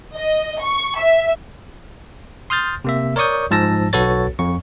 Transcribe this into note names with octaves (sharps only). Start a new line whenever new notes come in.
D#5
C#6
E5
C6 D#6 F6 G6 A6
C3 A#3 E5
A#4 C#5 D5 C#6 D#6 G6
G#2 F3 A5 E6 A#6
B1 F#4 A4 B4 C#5 A6
F2 C#6